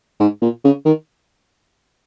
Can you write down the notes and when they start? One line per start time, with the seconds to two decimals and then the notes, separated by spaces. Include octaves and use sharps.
0.20 G#2
0.42 A#2
0.64 C#3
0.85 D#3